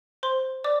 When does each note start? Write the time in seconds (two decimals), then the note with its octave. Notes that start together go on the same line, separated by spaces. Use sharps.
0.23 C5 C6
0.64 D5 D6